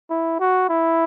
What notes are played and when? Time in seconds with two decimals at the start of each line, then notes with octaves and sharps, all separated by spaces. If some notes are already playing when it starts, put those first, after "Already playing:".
0.10 E4
0.40 F#4
0.69 E4